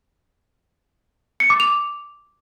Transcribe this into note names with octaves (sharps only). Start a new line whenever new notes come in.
C#7
D6
F7